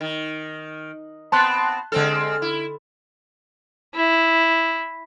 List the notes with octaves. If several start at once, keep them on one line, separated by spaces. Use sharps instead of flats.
D#3
B3 C4 A5 C6 F#6
D3 G#3 C4 A4 F6
E4
E4